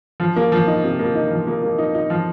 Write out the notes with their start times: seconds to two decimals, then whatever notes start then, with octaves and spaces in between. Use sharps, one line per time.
0.20 F3
0.36 A#3
0.52 F3
0.67 D#4
0.84 C3
0.99 A#3
1.15 D#4
1.30 F3
1.47 A#3
1.62 A#3
1.78 D#4
1.95 D#4
2.10 F3